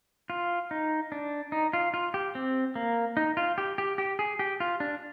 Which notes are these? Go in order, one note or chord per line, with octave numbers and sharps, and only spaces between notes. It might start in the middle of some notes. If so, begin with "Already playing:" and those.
F4
D#4
D4
D#4
F4
F4
G4
C4
A#3
D#4
F4
G4
G4
G4
G#4
G4
F4
D4